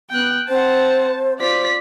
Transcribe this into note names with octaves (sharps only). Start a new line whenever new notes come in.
B3 G5 F#6
C4 C5 F#5 A5
F4 C5 D5 B6